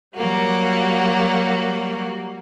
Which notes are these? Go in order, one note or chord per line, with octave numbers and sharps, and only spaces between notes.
F#3 G3 A#3 F#4